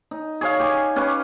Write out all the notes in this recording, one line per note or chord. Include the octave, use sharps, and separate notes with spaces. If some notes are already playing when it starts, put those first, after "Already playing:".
D#4
G#4 C#5 F5
G4 G#5 C#6
C#4 G4 B4